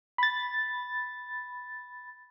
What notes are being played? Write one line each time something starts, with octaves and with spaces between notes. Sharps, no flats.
B5 A6